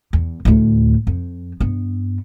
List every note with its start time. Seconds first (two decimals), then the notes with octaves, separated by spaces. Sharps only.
0.13 E2
0.45 D2 A2
1.07 F2
1.60 G2 B3